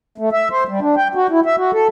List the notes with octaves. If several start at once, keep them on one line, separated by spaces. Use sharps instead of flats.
A3
E5
C5
G3
D4
G5
F#4
E4
E5
F#4
A4